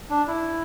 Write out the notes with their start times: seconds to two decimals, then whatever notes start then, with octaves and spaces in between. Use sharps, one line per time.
0.10 D4
0.28 E4